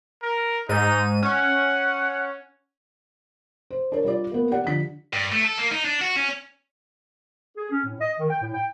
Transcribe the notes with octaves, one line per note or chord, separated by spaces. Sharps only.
A#4
G#2 D#4 D#7
C#4 F#5
C5
D4 A#4 C#5
G3 F4 D5
A#3 B3
G4 D5 F#5
D3 F3 B6
G2
A3
A4
A#3
D#4
D4
F#4
C#4
G#4
C#4
A2
D#5
D#3
G5
A2
G5